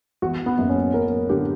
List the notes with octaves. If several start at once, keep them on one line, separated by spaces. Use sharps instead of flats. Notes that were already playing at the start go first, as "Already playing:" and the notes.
E2 F#4
B3
F#1
C#4
F#1 A#4
D3 G4